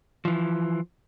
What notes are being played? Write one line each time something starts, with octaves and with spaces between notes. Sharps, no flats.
E3 F3